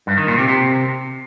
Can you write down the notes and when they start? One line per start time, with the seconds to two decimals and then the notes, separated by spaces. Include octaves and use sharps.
0.07 G2
0.17 D#3
0.28 A#2
0.38 C3
0.48 C3